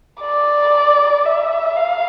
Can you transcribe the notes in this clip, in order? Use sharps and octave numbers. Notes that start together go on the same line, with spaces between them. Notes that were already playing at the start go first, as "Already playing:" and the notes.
D5
E5
F5